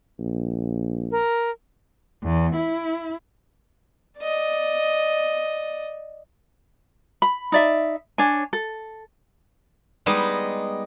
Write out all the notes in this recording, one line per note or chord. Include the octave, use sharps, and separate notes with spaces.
A#1
A#4
E2
E4
D5 D#5
B5
D#4 D5 E5
D4 C#5 G#5
A4
G3 G#3 B3 D#4